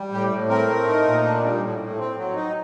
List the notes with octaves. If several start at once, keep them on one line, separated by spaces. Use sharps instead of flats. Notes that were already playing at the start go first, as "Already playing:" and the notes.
Already playing: G3
A2 G4
A2
C4 A#4
A3
D#4
A#2
D4
G3
A2
A2
C4
F#3
D#4